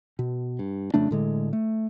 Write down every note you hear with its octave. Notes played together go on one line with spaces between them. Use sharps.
B2
G2
F2 C#3 A3 D4
A2 D3 G#3
A3